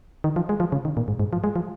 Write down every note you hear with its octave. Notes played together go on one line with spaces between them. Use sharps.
D#3
F3
G#3
F3
C#3
D#3
A#2
G#2
G#2
F3
G#3
F3